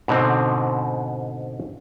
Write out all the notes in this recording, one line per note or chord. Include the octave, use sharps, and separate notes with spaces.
G#2 B2 D3 C4